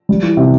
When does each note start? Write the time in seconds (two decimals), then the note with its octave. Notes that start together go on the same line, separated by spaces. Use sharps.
0.09 G3
0.23 E3
0.37 C3